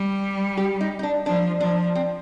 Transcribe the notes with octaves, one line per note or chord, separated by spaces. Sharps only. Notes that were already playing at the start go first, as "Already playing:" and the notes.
Already playing: G3
G4
D#4
D#4
D4
F3 D4
F3 D4
C4